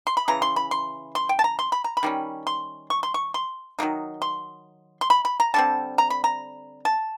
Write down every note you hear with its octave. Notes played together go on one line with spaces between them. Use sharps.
C6
B5
C#3 E3 A#5
C6
B5
C6
C6
G5
A5
A#5
C6
B5
A#5
B5
D#3 G3 A#3 C#4
C6
C#6
C6
C#6
C6
D#3 F#3 A#3 D#4
C6
C6
B5
B5
A#5
D3 G3 C4 A5
A#5
B5
A#5
A5